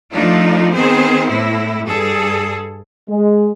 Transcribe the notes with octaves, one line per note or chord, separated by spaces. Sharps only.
F3 A3 D4 D#4 F4
D#3 B3 C4 G#4 C5
A2 E4
G2 G#4 A4
G#3